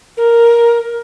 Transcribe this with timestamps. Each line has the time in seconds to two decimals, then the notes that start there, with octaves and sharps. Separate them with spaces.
0.17 A#4